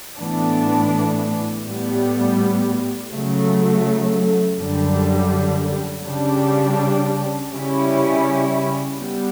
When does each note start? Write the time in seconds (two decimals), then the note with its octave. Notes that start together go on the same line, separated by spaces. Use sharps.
0.18 A2 E3 B3 D4
1.65 A2 G3 B3
3.12 C#3 F#3 A3
4.59 F#2 D3 G3
6.06 C#3 G3 D4
7.52 C#3 G3 C#4 E4
9.00 G3 B3